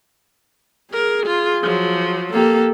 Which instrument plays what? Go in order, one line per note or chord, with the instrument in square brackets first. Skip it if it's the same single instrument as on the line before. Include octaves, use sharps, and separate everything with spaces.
[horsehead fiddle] G#4 [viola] A#4
[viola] F4
F3 F#3
[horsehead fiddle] A#3 G4 [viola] A4